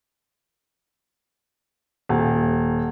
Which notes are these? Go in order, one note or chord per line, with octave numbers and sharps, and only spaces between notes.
D#1